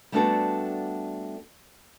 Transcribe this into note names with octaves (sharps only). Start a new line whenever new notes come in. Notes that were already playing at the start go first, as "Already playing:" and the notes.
G3 A3 B3 D4 F#4 A4